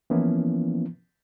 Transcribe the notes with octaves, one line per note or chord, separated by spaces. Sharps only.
E3 F3 A#3 B3 C#4 E4